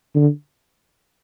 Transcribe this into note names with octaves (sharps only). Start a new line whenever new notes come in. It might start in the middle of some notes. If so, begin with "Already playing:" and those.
D3